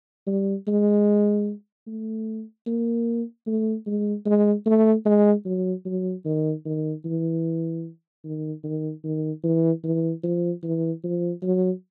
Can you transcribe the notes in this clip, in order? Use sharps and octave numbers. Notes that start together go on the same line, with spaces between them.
G3
G#3
A3
A#3
A3
G#3
G#3
A3
G#3
F#3
F#3
D#3
D#3
E3
D#3
D#3
D#3
E3
E3
F3
E3
F3
F#3